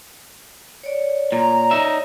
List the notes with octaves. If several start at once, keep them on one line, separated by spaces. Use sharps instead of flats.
C#5 D5
A#2 A#5
D#4 E5